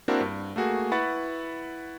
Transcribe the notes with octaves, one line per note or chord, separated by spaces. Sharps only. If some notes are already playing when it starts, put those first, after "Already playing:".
A#3 C4 D4 E4 F#4 A#4
G2
A3 A#3 F#4 G#4
E4 B4 F#5 C#6 A6